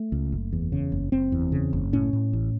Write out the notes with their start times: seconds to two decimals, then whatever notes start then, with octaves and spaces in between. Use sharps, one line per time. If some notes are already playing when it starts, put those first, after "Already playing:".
Already playing: A3
0.12 C#2
0.32 F#1
0.53 E2
0.72 C#3
0.92 F#1
1.12 F#1 C4
1.32 E2
1.52 C#3
1.73 F#1
1.93 A2 C#4
2.13 A2
2.33 A1